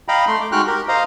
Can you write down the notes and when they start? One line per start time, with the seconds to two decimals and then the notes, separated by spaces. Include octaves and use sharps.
0.08 D#5 F5 G5 A#5 B5
0.28 A3 C6
0.40 D6
0.52 G#3 D#4 F#4 G5 F6 F#6
0.67 G4 A#4
0.88 C5 D#5 F5 A#5